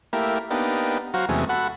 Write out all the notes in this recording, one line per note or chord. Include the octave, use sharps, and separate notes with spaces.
A3 A#3 E4 G4 A#4
A#3 B3 D4 D#4 G4
F#3 F#4 C5 F5 A#5
E2 C3 F#3 G#3 A3 C#4
F#4 A4 F#5 B5